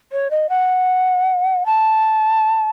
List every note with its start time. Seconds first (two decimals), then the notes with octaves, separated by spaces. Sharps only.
0.12 C#5
0.31 D#5
0.49 F#5
1.66 A5